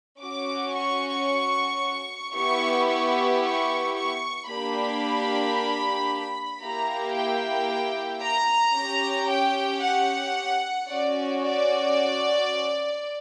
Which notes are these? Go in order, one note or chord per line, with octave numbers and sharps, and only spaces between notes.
C#4 F#4 D6
C#6
B3 E4 G4 C#6
C#6
C#6
C#6
A#3 D4 G4 B5
A#3 E4 G4 A#5
G5
A#5
C#4 G4
G5
F#5
C#4 F#4 D5
D5